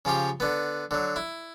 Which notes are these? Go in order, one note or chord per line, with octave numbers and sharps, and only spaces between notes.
C#3 F3 C#4 G4
D3 B3
D3 F#3
E4